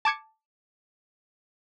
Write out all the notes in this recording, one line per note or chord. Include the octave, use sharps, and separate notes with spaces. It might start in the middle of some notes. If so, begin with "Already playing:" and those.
A5 D6 G#6 C#7